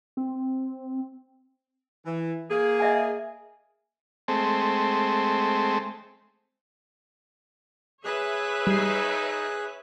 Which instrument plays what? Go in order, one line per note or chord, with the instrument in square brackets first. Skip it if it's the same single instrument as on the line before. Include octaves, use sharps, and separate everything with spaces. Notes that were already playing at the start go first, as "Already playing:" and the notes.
[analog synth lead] C4
[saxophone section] E3
A#3 G#4
[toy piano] D#5 E5 G#5
[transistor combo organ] G#3 A3 C4
[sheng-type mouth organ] G#4 F#6 [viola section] B4 C#5 E5
[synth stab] G3 C7 [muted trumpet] D#4